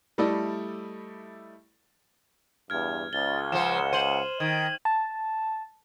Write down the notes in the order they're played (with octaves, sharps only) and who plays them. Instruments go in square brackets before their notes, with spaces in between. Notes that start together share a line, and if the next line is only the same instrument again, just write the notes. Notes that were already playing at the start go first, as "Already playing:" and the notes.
[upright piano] G3 A3 E4 A4 D5 D#5
[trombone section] E2 G2 [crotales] F6 G#6
[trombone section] C#2 [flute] A6 [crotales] G7
[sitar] F3 C5 [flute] F#5 [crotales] E7
[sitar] C5 [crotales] D#7 F#7
[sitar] D#3 [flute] G#6
[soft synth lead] A5